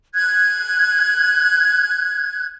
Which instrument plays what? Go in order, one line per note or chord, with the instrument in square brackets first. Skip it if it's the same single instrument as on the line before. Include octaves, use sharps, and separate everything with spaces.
[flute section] F#6 G#6